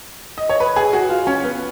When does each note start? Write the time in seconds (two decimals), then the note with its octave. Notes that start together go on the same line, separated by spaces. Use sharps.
0.38 D#5
0.49 C#5
0.60 B4
0.76 G#4
0.93 F#4
1.09 F4
1.27 C#4
1.44 B3